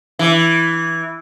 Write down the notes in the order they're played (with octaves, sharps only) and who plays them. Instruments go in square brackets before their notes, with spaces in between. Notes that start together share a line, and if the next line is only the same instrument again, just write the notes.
[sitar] E3